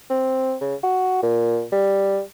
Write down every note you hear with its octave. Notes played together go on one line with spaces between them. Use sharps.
C4
C#3
F#4
A#2
G3